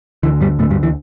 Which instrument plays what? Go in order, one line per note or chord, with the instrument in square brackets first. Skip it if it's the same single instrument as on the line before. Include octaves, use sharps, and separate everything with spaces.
[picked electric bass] D2 D3 E3
G2 G3
D2 A2 D3 A3
G2 G3
E3